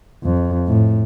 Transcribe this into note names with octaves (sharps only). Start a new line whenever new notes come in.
F2
A2